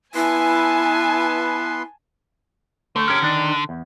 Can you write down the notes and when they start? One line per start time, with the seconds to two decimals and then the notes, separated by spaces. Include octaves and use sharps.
0.15 B3 E4 B4 G#5 A5 C6
2.96 D3 A3
3.08 C#4 G4 A#4
3.22 D#3 D4
3.69 E2